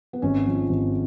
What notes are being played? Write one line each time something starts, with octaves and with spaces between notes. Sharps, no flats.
B3
G#1 C#4
F3
G#1